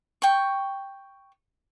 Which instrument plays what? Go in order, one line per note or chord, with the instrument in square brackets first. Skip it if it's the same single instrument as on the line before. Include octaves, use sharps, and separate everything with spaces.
[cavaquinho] G5 C#6